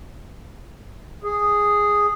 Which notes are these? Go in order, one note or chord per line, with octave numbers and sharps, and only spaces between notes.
G#4